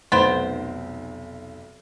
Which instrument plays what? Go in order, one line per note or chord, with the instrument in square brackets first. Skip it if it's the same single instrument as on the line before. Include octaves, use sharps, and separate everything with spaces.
[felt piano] F1 B1 D7 [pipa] B3 C5